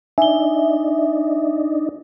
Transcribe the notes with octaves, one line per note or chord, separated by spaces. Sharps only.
D4 D#4 E5 G#5 G7